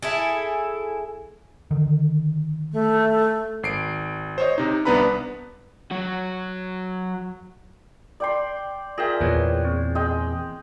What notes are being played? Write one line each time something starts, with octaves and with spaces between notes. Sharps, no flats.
E4 G#4 A4
D3 D#3
A3
G#1 C7 D7
C5 C#5 D#5
C3 D#4
C2 B3 D4 B4 A#5 B5
F#3 F#4
D5 G5 C6
F4 G#4 A#4 E5 G5
E2 A#2 F4 B4 C#5
C4
G#3 D#5 G5